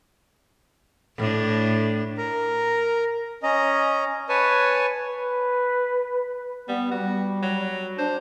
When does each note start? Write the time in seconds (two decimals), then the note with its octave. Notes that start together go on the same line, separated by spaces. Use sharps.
1.17 A2 D4
2.18 A#4 A#5
3.43 C#4 D#5 A#5
4.29 B4 C#5 G#5 A5
5.10 B4
6.69 G3 B3
6.91 G3 F#4
7.43 F#3
7.99 D4 C5